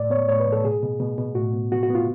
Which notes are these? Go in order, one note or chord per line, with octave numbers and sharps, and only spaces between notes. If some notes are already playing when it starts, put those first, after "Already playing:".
Already playing: A2 D5
B3 C#5
A2 C#5
B4
A2
A4
B2 G#4
B2
B2
B2
A2 F#4
B3
B3 F#4
F#4
B3
F4